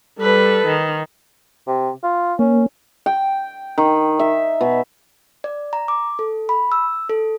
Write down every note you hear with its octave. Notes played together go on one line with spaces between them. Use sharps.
G3 A4 B4
D#3
C3
F4
A#3 C#4
G5
D#3
E5
B2
D5
A#5
D6
A4
B5
E6
A4